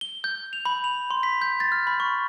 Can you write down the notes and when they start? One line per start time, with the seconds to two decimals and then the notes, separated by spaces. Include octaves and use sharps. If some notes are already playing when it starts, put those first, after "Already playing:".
0.01 G7
0.24 G6
0.53 F7
0.65 B5
0.84 F7
1.11 C6
1.23 B6
1.41 G6
1.60 A6
1.72 F6
1.87 B5
2.00 C#6